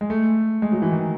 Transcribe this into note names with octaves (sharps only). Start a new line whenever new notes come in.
G#3
A3
G#3
F#3
E3
D#3